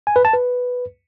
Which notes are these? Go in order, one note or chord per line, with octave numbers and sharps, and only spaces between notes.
G#5
B4
A5
B4